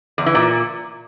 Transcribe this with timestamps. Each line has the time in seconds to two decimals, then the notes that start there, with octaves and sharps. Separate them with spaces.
0.18 E2
0.26 E3
0.35 A#2